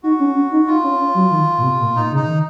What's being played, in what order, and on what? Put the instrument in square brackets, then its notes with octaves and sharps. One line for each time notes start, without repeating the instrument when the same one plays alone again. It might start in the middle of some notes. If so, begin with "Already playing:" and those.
[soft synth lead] D#4 [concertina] F#4
[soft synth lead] C#4
C#4
D#4
[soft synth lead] D#4 [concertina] F4
[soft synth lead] C#4
C#4
F#3
D#3
A#2
C3
A#2
[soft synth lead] A#2 [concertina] D#4
[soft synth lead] C#3
[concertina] D#4
[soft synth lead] D#3